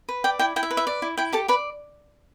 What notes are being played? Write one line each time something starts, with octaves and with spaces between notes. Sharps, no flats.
B4
D5 G5
E4 G5
E4 G5
E5
B4
E5
D5
E4
E4 G5
G4 A4 A5
B4 D5 B5